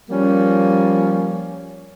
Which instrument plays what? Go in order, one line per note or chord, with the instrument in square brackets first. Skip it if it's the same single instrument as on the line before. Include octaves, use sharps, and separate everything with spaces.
[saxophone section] F3 G3 A#3 C#4